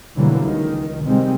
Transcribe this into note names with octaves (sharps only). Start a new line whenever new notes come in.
B2 D3 E3 F#3 G3 A#3
C#2 D#3
C3 D#3 G3 G#3 C4